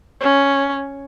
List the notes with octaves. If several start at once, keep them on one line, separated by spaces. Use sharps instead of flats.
C#4